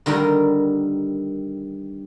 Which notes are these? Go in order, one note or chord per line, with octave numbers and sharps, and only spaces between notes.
D3 D#3 G3 A#4